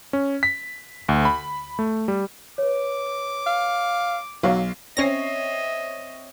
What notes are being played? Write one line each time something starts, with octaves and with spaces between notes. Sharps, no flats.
C#4
B6
D2
B5
A3
G3
B4 C#5 D6
F5
B1 F#3 F5
C4 C#4 C#5 D#5 E5 A#6 C7